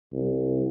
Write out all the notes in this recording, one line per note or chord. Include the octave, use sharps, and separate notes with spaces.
C2